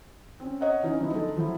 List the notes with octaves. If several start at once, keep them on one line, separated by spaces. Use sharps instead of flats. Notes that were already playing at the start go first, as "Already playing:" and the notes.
C4 C#4
C#5 D#5 F#5
E3 C#4 D#4
F3 F#3 B3 D#4 E4
D3 G#3 D#4 A4
F3 F#3 E4